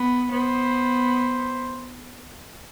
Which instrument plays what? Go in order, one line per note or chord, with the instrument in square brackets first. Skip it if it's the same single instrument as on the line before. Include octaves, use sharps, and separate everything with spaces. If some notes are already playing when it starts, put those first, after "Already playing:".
Already playing: [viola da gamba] B3
[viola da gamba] B3 [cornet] C5